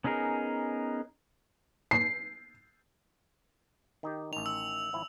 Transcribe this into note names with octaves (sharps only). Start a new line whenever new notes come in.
B3 C#4 D#4 G#4 A#4
C7
D#3 D#4 G4
A1 D#3 F7
E6
G#1 F3 E4